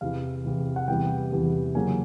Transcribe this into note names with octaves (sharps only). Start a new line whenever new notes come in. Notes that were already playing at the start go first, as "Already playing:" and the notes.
E2 C3 E3 F5
E2 C3 E3
F#5
E2 C3 E3 G3 B3 G5
E2 C3 E3 G3 B3
C#3 F#3 A#3 C#4 G#5